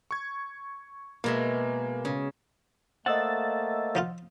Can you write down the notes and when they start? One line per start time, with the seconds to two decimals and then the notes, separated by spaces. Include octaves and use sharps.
0.11 C#6 G#6
1.24 B2 G#3 A#3 E5
2.05 C#3
3.06 A3 A#3 C5 D5 D#5 F#5 E6 A6
3.95 F3 D#4 F4